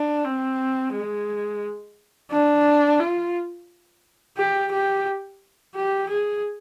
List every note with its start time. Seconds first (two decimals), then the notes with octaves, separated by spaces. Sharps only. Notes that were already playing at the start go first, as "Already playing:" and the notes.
Already playing: D4
0.24 C4
0.93 G#3
2.31 D4
3.00 F4
4.38 G4
4.72 G4
5.75 G4
6.09 G#4